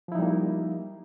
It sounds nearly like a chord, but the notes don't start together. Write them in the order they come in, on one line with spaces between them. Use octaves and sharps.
F3 E4 D#4 G3 A#3